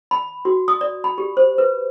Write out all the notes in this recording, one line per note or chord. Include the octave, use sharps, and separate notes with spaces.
B5
F#4
D#6
D5
B5
G4
C5
B4